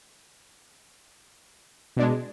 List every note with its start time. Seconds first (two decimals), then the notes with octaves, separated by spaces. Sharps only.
1.97 B2
1.99 D4
2.02 G#3